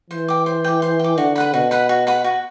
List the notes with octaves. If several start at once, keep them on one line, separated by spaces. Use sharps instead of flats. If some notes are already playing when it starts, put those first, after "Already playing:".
E3 C5
G5 D6
C5
G5 D6
C5
G5 D6
D3 F#4
B4 F#5 B5
B2 F#4
B4 F#5 B5
F#4
B4 F#5 B5
F#4